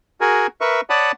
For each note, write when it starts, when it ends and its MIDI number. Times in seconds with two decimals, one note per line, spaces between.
0.21 0.47 66
0.21 0.47 68
0.21 0.47 70
0.21 0.47 80
0.61 0.81 70
0.61 0.81 71
0.61 0.81 76
0.61 0.81 85
0.90 1.12 73
0.90 1.12 74
0.90 1.12 78
0.90 1.12 81
0.90 1.12 83
0.90 1.12 87